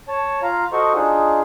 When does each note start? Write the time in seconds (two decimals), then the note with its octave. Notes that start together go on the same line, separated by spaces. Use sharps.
0.09 C#5 A5
0.43 F4 F5 A#5
0.73 F#4 A4 C5 D#5 C#6
0.94 D4 D#4 F4 G#4